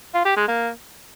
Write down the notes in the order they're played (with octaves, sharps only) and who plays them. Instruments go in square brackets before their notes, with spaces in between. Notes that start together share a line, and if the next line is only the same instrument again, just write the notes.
[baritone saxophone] F4
G4
G#3
A#3